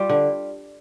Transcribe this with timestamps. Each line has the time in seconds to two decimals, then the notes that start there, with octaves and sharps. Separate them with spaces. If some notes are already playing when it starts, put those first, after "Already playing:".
Already playing: G3 F4
0.10 D3